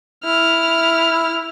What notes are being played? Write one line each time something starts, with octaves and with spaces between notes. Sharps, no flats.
E4 F6